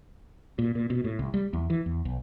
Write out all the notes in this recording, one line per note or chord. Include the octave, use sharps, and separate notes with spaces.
A#2
A#2
B2
A2
C2
G3
E2
E3
E2
B1